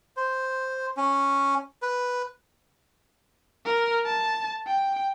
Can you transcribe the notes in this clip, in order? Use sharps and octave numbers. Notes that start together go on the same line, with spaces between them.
C5
C#4
B4
A#4
A5
G5